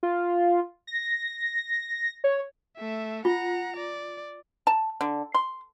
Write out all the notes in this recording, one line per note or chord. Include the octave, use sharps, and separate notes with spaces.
F4
A#6
C#5
A3 E5
F4 F#5 A#5
D5
A5
D3
C6